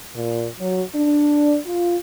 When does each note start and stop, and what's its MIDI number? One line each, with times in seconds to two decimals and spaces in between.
0.15 0.46 46
0.59 0.82 54
0.94 1.58 62
1.65 1.95 65